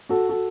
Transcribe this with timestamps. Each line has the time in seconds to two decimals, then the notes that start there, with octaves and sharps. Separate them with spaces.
0.09 F#4 A4
0.29 F#4 A4